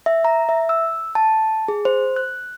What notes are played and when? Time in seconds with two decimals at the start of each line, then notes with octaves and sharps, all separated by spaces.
0.06 E5
0.25 A#5
0.49 E5
0.69 E6
1.15 A5
1.68 G#4
1.85 C5
2.16 F#6